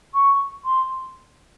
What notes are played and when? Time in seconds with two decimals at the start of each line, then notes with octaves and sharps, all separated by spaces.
0.13 C#6
0.64 C6